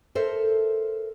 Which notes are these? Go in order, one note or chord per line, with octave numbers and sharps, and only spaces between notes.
A4 A#4 C5 E5